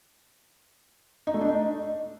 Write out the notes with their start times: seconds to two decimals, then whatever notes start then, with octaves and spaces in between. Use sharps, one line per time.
1.27 D#4
1.34 A3
1.41 D4
1.48 D#4